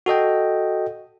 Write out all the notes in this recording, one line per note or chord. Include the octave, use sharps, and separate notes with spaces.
F#4 A4 D#5 G5